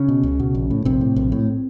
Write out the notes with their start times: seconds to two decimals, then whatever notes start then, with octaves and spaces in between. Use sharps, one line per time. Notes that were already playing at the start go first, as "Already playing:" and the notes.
Already playing: C#3 C#4
0.09 B2
0.23 C#2
0.40 B2
0.55 A#1
0.71 A2
0.85 A#1 C3 C4
1.01 A2
1.16 A#1
1.32 A2